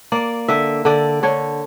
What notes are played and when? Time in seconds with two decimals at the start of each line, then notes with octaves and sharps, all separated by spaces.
0.12 A#3 D5
0.48 D3 E5
0.85 D3 D5
1.23 D3 C#5